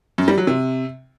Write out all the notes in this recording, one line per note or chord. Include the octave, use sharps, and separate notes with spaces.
F#2
G3
F#3
C3